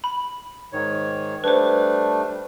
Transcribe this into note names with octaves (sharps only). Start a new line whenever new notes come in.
B5
G#2 D#3 C#5
G3 A3 D4 B4 C5